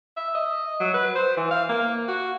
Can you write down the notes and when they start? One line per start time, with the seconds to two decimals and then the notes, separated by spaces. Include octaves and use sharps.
0.17 E5
0.35 D#5
0.80 F#3
0.94 B4
1.15 C5
1.37 E3
1.51 F5
1.69 A#3
2.08 F#4